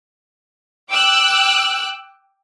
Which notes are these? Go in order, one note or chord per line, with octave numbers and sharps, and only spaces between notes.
G5 D6 E6 F#6